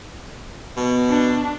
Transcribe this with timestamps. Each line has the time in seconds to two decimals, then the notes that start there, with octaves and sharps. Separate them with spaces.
0.77 B2
1.10 D4